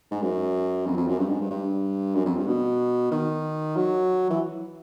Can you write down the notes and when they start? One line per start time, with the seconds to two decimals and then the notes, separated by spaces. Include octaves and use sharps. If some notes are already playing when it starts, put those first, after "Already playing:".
0.11 G#2
0.22 F#2
0.86 F2
0.97 F2
1.07 F#2
1.18 G2
1.29 G#2
1.40 G2
1.51 G2
2.15 F#2
2.25 F2
2.37 G2
2.47 B2
3.11 D#3
3.76 F#3
4.30 E3